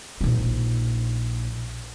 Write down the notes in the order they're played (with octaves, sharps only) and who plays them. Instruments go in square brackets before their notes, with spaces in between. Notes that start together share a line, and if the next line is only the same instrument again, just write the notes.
[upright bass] A#1 D#4